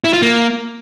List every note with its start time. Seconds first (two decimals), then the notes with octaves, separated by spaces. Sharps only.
0.04 E4
0.13 F4
0.22 A#3